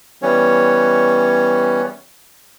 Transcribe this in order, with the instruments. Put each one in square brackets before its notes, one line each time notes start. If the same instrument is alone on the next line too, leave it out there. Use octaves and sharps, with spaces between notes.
[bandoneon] E3 G3 B3 C#4 C#5